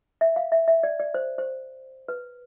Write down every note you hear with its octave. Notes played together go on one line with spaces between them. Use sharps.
E5
F5
E5
E5
D5
D5
C5
C5
B4